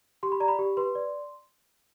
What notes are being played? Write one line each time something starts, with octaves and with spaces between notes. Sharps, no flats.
G4 C6
B5
D5 A#5
B5
G4
B4 C6
D5